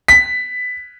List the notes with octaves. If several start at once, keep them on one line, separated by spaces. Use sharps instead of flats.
B6